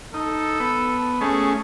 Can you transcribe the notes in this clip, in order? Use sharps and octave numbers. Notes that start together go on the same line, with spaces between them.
D#4 A4
B3
A3 C#4 G#4